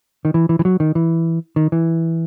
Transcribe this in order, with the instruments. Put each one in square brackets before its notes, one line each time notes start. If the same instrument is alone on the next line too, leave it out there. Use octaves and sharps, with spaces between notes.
[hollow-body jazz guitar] D#3
E3
E3
E3
F#3
D#3
E3
D#3
E3